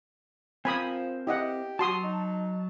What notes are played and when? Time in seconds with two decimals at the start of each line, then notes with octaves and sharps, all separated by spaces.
0.65 F3 C4 A#4 C5 G#5 B5 D#6
1.27 E4 G4 D#5 F#5
1.79 F#3 F#4 A5 C6 D#6
2.04 D#4